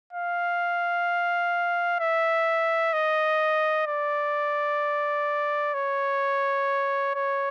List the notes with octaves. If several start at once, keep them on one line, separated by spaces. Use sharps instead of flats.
F5
E5
D#5
D5
C#5
C#5